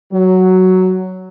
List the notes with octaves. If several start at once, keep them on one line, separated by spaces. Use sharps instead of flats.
F#3